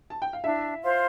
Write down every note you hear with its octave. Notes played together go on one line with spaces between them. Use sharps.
A5
G5
F5
D4 E4 E5
F4 C5 F5